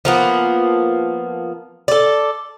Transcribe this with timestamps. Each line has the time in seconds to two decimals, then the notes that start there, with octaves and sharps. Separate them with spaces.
0.05 F3 A#3 B3
1.88 A4 D5